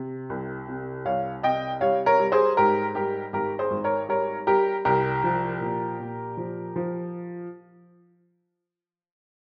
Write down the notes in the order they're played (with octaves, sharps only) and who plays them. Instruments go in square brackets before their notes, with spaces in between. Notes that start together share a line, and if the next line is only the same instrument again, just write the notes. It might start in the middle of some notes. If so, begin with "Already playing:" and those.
Already playing: [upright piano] C3
C2
C3
C2 C#5 F5
C3 D#5 G5
G3 C#5 F5
A#4 C#5
G3
G#4 C5
G#2 G4 A#4
G3 G4 A#4
G#1 G4 A#4
G#4 C5
G#1
A#4 C#5
G3 A#4 C#5
G3 G4 A#4
C2 G4 A#4
F3
A#2
A#2
F3
F3